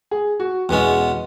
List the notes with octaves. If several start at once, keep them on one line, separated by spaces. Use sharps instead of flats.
G#4
F#4
E2 B2 G#3 C#4